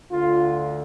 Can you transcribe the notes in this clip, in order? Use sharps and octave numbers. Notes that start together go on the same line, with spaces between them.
D2 D3 F4